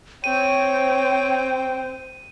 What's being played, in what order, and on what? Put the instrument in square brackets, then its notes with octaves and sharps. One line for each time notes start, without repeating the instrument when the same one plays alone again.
[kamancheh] C4 C5 [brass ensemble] C#5 [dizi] G5 [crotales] D#7